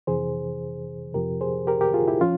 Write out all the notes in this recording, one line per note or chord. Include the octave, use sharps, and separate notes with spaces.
F2 C3 E3 G#4 C5
F2 C3 F3 G4 A#4
G#4 C5
G4 A#4
G4 A#4
F4 G#4
E4 G4
F3 C#4 F4